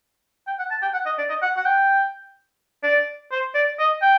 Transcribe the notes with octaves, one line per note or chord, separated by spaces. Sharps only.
G5
F#5
A5
G5
F#5
D#5
D5
D#5
F#5
F#5
G5
D5
C5
D5
D#5
G5